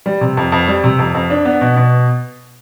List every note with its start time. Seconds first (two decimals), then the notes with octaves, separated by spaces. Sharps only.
0.06 G3
0.21 C3
0.37 F2
0.52 F2
0.68 G3
0.84 C3
0.99 F2
1.15 F2
1.30 D4
1.45 B3
1.61 B2
1.77 B2